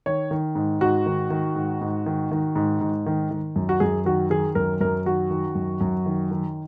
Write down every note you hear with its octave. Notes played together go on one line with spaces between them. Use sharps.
D#3 C#5
D#3
G#2
G#2 F#4
D#3
D#3
G#2
G#2
D#3
D#3
G#2
G#2
D#3
D#3
F#2
F#4
F#2 G#4
D#3 F#4
D#3 G#4
F#2 A#4
F#2 A#4
D#3 F#4
D#3
F#2
F#2
D#3
D#3